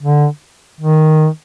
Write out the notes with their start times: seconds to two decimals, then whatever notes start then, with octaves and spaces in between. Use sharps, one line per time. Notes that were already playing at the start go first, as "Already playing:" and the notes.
0.03 D3
0.81 D#3